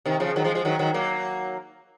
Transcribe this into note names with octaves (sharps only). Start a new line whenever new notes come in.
C3 D#3
C#3 F3
D#3 F#3
F3 G#3
F3 G#3
D#3 F#3
D#3 F#3
F#3 A#3